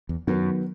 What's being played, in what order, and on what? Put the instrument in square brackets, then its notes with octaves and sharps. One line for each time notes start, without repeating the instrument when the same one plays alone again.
[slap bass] E2
[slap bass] F#2 [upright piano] D#3 F#3 B3